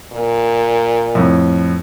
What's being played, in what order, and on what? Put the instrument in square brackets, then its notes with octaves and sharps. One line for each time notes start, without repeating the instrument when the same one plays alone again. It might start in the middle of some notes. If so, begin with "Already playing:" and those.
[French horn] A#2
[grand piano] F2 A2